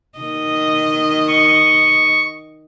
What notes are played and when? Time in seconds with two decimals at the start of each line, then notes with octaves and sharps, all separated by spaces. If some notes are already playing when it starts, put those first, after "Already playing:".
0.19 D#3 D#5
1.28 C#6